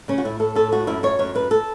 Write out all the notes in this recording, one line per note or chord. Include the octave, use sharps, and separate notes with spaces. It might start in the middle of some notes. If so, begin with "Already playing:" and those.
C#3 C#4
F#4
A2 E4
A2 A4
A2 A4
A3 F#4
F#2 E4
F#2 C#5
F#2 C#5
F#2 B4
A4